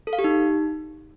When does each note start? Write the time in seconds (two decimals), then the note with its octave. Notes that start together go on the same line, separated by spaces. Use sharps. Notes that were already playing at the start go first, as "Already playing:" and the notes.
0.07 A4
0.13 F5
0.19 G4
0.24 D#4